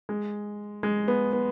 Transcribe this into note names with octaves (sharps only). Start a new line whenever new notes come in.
G#3
G#3
B3
B3